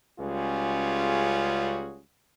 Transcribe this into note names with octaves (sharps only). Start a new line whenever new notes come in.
C#2 G3 C#4 F4 F#4 G#4